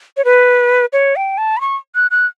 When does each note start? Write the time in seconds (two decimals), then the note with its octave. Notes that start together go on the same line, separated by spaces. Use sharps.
0.17 C#5
0.25 B4
0.93 C#5
1.16 G5
1.38 A5
1.57 B5
1.61 C#6
1.95 F#6
2.11 F#6